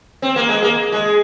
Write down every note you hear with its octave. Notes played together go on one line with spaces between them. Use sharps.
C4
A#3
G#3
A#3
G#3